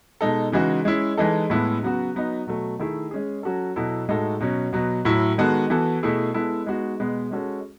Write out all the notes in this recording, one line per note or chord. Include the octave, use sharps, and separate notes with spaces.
B2 G#3 D#4 A4
C#3 E3 G#3 D#4 F#4
G#3 C#4 E4
E3 G#3 D#4 A4
A2 G#3 B3 E4 A4
C#3 F#3 B3 F#4
F#3 B3 D#4
B2 F#3 A3
D#3 A3 E4 G#4
G#3 C#4 G#4
F#3 C#4 F#4 A4
B2 F#3 B3 E4 A4
A2 G#3 D#4 F#4 A4
B2 F#3 C#4
B2 F#3 B3
A2 F#3 A3 E4
D#3 G#3 B3 F#4 A4
E3 B3 F#4 A4
B2 A3 E4 G#4
G#3 B3 E4 A4
G#3 B3 D#4 F#4
B2 G#3 B3
G#3 C#4 F#4 A4